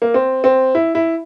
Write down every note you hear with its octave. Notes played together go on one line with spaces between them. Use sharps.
A#3
C4
C4
E4
E4